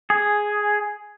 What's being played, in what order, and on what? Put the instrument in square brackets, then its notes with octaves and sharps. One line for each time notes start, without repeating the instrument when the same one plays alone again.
[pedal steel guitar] G#4